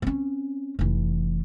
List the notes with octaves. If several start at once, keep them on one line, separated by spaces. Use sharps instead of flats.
C4 C#4
F1 E3